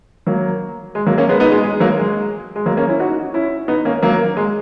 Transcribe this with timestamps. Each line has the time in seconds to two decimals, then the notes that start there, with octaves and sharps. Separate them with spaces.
0.27 F#3 A#3
0.95 G#3
1.07 F#3 A#3
1.18 A#3 C#4
1.29 G#3 B3
1.40 B3 D#4
1.52 G#3 B3
1.63 G#3
1.80 F#3 A#3
1.98 G#3
2.56 G#3
2.66 F#3 A#3
2.77 A#3 C#4
2.89 C#4 E4
3.00 D#4 F#4
3.34 C#4 E4
3.68 B3 D#4
3.85 A#3 C#4
4.03 F#3 A#3
4.37 G#3